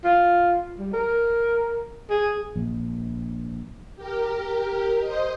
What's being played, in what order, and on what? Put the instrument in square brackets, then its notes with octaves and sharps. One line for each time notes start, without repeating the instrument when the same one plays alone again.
[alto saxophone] F4
G3
A#4
G#4
[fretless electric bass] A#1
[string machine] G4 A#4
C5 D#5